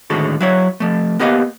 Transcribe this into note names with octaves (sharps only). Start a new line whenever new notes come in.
A2 D3 D#3 G#3 F#4 A4
F#3 E4 C#5
F3 A3
A#3 B3 G4 D#5 F5